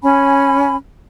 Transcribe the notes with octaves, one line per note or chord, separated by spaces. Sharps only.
C#4 G#5 B5